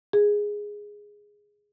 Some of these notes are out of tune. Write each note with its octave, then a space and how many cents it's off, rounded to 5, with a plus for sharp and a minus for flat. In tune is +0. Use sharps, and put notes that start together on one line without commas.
G#4 -5